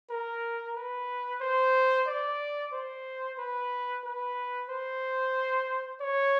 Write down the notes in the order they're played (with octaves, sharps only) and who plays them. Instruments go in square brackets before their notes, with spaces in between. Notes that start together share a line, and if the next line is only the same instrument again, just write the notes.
[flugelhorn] A#4
B4
C5
D5
C5
B4
B4
C5
C#5